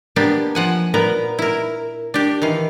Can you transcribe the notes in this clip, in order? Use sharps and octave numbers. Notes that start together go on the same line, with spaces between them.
A#3 B3 D4 G4
F3 F#5 G#5
A#2 B3 A#4 B4 A#5
E4 A#4
D4 G4
D#3 E3 F5